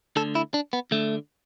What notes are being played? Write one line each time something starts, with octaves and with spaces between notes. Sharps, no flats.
D2 D3 A4
E4
D4
B3
D2 D3 A3